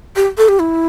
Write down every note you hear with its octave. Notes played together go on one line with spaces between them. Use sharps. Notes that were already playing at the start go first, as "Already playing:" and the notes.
G4
A4
G4
E4